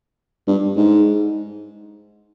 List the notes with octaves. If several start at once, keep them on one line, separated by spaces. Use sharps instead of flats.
G2
G#2